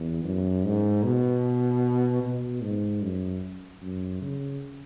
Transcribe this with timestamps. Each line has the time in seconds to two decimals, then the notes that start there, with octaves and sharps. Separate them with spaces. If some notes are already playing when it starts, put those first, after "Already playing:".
Already playing: E2
0.24 F#2
0.64 G#2
1.03 B2
2.23 B2
2.62 G#2
3.02 F#2
3.82 F#2
4.22 C#3